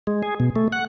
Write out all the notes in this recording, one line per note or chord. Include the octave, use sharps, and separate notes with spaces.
G#3
G#4
B2
A3
F#5